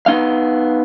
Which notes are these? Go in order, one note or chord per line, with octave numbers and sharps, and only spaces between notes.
B3 D#4 F5